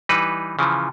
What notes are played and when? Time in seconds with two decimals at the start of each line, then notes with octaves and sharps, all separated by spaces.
0.09 E3 G3 D#4 B4
0.59 C#3 E3 F3